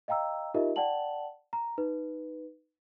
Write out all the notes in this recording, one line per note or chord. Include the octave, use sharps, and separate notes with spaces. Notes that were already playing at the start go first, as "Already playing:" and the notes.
D#5 F5 G5 A#5 E6
D#4 F4 G4 A#4 D#5 E5
D5 F#5 G5 A5 F#7
A#5
D#4 B4